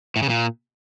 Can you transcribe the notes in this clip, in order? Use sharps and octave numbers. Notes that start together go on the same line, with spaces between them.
A2
C#3
A#2